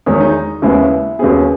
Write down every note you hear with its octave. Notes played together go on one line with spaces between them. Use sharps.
E2 D#3 G#3 C#5
D#4
D#2 C#3 G#3 B3 E4
D#2 C#3 F#3 B3 G#4